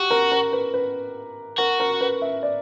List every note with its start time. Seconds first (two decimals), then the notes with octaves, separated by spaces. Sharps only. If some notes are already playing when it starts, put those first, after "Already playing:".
Already playing: F#4 G4
0.11 A#4
0.32 A#4
0.53 B4
0.74 B4
1.58 F#4 A#4
1.80 A#4
2.01 B4
2.22 E5
2.43 D5